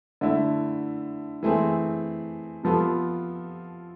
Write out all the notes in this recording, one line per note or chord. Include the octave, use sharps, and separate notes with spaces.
D3 A3 E4
E3 A3 C4 G#4
C3 F3 B3 F4 A4